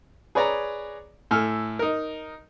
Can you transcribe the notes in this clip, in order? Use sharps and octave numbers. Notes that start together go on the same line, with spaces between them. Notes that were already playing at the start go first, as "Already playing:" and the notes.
G#4 B4 C#5 D5 A#5
A2 A4 G#5 F6
D#4 A#4